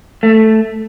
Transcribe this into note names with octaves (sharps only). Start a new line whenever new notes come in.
A3